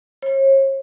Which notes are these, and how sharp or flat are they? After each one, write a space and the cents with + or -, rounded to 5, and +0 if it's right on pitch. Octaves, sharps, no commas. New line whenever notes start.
C#5 -40